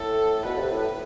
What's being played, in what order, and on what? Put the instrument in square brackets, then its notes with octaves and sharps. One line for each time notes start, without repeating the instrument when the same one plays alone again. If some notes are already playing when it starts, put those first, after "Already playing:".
Already playing: [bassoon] A2 [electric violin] A4
[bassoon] B2 [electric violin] B4
[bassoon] C3
A2